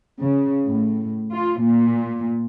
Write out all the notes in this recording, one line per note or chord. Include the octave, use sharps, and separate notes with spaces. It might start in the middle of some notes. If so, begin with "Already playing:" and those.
C#3
A2
F4
A#2